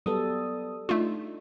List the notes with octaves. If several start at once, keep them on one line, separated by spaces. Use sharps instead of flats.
F#3 G3 B3 A4 D#6
A3 D4 D#4 F4